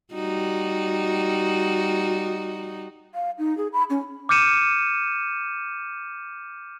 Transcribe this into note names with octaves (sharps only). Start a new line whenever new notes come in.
G3 D#4 F#4
F5
D#4
G#4
B5
C#4
D6 F6 G6 C#7 D#7 E7